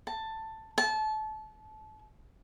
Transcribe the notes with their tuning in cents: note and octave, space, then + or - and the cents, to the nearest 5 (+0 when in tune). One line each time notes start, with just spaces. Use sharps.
A5 +10
A5 -25